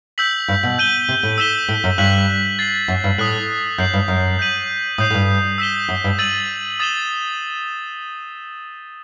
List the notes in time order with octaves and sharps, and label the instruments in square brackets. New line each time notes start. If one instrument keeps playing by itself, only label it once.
[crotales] E6 G6 B6 F#7
[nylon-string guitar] G2
B2
[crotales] G6 D#7 G7
[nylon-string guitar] C3
A2
[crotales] E6 B6 E7 G7
[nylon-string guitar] A2
F#2
[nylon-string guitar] G2 [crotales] F#6 B6 F#7
[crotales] A6 C7 F#7
[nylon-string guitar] F#2
G2
[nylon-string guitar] A2 [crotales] D#6 F#6 B6 F#7
[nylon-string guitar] F#2 [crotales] G6 C7 F#7
[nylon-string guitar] G2
F#2
[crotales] G6 B6 D#7 F#7
[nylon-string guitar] A2 [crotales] D#6 G6 C7
[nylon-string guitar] A2
G2
[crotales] E6 B6 E7 G7
[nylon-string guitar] F#2
G2
[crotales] E6 A6 D#7 F#7
D#6 A6 E7 G7